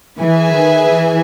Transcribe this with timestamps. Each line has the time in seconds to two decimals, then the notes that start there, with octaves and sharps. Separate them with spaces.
0.20 E3 G#4 B4 E5 G#5
0.55 D#3
0.91 E3